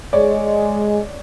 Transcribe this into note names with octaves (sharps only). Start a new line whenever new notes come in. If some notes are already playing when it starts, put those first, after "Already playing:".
G#3 C#5 D5